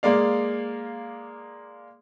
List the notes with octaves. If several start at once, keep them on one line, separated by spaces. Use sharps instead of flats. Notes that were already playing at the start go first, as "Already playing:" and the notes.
G#3 A#3 D5 F5